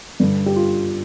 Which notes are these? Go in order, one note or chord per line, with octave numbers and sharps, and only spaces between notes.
G2 D3
G4
F4